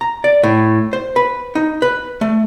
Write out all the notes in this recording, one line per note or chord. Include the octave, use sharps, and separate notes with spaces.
A#5
D5
A2
C5
B4
D#4
B4
A3